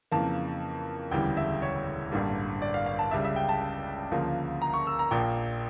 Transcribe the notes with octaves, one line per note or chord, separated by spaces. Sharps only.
F2 C#3 E3 A#3 A5
E1 D2 C#3 E3 G3 G5
E5
C#5
A1 G2 D3 G3 A#3
D5
F5
F5
A5
C#2 C#3 G3 E5
E5
G5
A5
D2 C#3 F3 A#3
A#5
C#6
E6
A#5
A#1 A#2 F3 A#3 G5